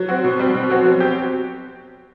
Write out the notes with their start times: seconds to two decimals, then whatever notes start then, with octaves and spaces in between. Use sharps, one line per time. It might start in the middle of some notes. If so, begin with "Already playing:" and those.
Already playing: F#3
0.09 C4 F#4
0.24 B2
0.39 G3 C4
0.55 B2
0.70 F#3 C4 F#4
0.85 F#3
1.00 C4 G4